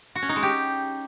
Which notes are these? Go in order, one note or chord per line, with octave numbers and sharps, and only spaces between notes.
F#4
C#4
D#4
G#3
G4